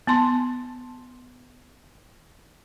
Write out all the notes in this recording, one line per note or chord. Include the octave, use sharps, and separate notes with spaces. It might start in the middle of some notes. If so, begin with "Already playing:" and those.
B3 A5 C6